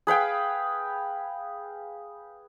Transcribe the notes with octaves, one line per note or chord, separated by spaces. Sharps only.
G#4 B4 F5 G5